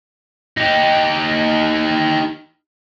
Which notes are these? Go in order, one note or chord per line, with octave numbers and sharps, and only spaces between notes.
D#4 G4